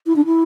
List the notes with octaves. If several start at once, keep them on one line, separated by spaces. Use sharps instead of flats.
E4
D4
E4